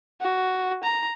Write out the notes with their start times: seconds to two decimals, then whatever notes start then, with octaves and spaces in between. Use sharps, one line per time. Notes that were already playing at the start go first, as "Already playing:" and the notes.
0.21 F#4
0.84 A#5